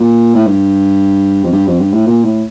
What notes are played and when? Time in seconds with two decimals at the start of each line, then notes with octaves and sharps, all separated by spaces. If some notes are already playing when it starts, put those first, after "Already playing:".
Already playing: A#2
0.35 A2
0.47 G2
1.44 F2
1.52 G2
1.67 F2
1.79 G2
1.93 A2
2.06 A#2
2.24 A2